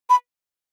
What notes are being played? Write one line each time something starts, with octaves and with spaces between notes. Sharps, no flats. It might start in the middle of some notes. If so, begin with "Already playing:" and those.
B5